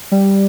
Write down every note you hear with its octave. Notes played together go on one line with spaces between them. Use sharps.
G3